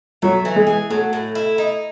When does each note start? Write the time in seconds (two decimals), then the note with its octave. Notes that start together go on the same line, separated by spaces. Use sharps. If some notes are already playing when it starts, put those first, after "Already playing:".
0.22 F#3 A3
0.45 E3
0.56 G#3
0.67 G#4
0.90 F#3 A3
1.13 A2
1.35 E4
1.58 D#4